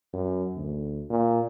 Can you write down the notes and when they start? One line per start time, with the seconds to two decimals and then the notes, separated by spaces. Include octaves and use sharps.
0.13 F#2
0.56 D2
1.09 A#2